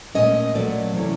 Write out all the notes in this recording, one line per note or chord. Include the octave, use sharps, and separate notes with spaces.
A#2 F#3 A3 C#4 D#5
A#2 F#3 A3 C#4 D5
C3 E3 A3 C#4